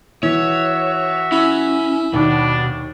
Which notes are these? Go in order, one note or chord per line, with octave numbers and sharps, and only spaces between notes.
E3 F#4 C#5 E5
C#4 E4
D#2 B2 G3 D4